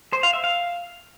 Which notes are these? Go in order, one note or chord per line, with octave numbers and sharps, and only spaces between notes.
C5
F5
E5
F5